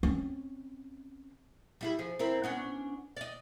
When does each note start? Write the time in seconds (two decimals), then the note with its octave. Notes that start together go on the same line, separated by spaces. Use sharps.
0.03 C4 C#4
1.81 G3 E4 G#4
1.99 F3 G#4
2.19 C4 E4 A#4
2.44 B3 C#4 D4
3.17 D5 D#5